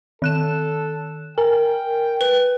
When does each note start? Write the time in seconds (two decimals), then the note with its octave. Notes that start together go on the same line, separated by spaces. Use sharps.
0.22 D#3 A4 F#6 E7
1.38 A#4 G5 G#5
2.21 B4